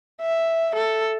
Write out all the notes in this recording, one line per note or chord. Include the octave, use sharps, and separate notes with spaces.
E5
A4